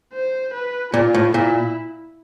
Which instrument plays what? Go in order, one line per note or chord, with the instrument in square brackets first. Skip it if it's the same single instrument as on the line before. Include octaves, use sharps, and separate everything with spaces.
[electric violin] C5
B4
[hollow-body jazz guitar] A#2 [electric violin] F4
[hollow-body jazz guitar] A2
[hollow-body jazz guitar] A#2 [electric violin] E4